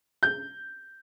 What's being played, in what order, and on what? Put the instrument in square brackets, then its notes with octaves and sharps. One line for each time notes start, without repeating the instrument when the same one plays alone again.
[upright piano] G6